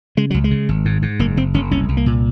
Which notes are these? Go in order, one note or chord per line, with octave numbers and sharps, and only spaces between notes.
C#3 G#3
C#2 F#3
G#3
C#3
G#1
G#2
G#2
F#1 A#3
F#1 C4
F#1 C#4
C2 C#4
C2
A#3
A#2